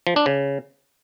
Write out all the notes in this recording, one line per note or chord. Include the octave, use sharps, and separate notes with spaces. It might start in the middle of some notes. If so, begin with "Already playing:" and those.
F3
D4
C#3